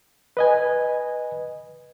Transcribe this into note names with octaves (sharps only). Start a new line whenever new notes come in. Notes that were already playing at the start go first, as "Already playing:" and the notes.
B4 D#5 G#5